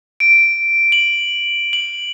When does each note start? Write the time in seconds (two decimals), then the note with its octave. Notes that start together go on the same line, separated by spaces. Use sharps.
0.20 D7
0.92 F#7
1.73 F#7